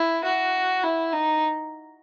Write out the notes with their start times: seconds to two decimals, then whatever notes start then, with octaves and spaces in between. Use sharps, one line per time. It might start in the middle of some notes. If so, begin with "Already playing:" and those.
Already playing: E4
0.24 F#4
0.83 E4
1.13 D#4